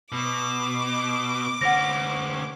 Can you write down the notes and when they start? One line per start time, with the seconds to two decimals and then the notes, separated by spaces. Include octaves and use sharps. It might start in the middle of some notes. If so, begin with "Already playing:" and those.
0.12 B2 D6
1.61 D2 C#4 F#5 A#6